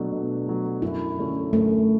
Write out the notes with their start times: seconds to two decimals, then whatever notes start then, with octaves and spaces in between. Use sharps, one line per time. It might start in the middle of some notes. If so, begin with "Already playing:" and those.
Already playing: B2 F#3 A3 D4
0.12 B2
0.47 F#3 A3
0.82 F#2 E4
1.18 D3 A3 C#4
1.53 F#2 A3